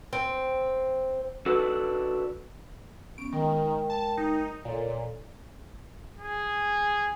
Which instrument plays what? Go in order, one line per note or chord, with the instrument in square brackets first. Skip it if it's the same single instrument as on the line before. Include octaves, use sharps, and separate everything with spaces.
[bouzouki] C4
[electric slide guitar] D4 F#4 A4 B4
[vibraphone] B3 C#4 [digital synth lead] D7
[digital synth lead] D#3 [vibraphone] G#3 A#4 G5
[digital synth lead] A5
D#4
[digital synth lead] A#2 [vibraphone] A4 C#5 D5
[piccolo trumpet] G#4